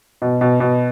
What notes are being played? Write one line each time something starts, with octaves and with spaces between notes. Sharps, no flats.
B2
B2
B2